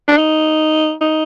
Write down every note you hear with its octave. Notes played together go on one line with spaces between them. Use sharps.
D4
D#4
D#4